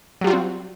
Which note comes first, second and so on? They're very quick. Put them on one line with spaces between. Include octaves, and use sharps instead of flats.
F#3 G3 F4 F#4 C4